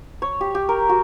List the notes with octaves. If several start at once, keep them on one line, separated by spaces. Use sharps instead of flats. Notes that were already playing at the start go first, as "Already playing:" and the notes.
C#5
G4
G4
A#4
F#4